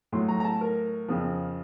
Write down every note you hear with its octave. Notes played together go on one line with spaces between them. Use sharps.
A2 F#3 C6
A#5
A#5
A5
A#4
F2 C#3 F3